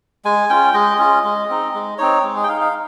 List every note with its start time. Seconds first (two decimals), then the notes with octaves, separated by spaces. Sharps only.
0.25 G#3 G#5
0.49 C#4 F4 G5
0.74 G#3 D#5
0.99 C#4 F4
1.24 G#3
1.49 C4 D#4
1.74 G#3
1.98 C4 D#4 C#5
2.24 G#3
2.36 G#4
2.43 G5
2.48 D#4 F5
2.61 F5